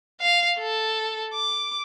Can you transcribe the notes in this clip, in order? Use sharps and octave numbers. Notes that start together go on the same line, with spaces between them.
F5
A4
D6